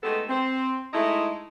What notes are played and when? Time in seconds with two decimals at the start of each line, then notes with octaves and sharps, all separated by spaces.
0.03 G#3 A3 B3 D#4 G4 A4
0.28 C4
0.93 G#3 A3 D#4 E4